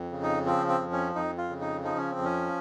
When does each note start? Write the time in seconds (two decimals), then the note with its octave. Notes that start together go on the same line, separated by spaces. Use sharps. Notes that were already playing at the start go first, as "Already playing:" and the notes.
Already playing: F2
0.11 C#3
0.23 D#4
0.46 F3 C4
0.69 C4
0.80 F2
0.92 C#4
1.15 F2 D#4
1.38 F4
1.49 C#3
1.61 D#4
1.84 F3 D#4
1.98 C#4
2.11 C4
2.18 F2
2.24 C#4